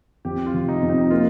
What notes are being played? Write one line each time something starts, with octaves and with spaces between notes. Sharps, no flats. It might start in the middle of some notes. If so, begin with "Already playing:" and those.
F2 G4
F4
F1
D#4
F2
D#4
A#3 F4